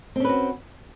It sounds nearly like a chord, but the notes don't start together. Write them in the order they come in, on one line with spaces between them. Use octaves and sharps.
C4 C#4 B4 F#4